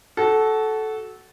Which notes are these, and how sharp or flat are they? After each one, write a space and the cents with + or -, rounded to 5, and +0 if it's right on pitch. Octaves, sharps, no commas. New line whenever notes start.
F#4 +15 A4 -15